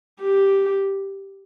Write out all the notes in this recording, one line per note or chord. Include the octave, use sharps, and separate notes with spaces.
G4